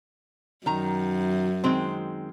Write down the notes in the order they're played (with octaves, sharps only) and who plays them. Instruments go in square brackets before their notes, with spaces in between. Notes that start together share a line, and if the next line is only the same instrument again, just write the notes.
[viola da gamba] F#2 [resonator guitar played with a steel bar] D#3 A#5
[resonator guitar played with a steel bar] D#3 G#3 C4